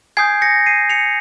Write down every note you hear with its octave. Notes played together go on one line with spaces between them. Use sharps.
G#5 D#6 G6 G#6 C7
A#6 C#7
C7 D#7
C#7 F7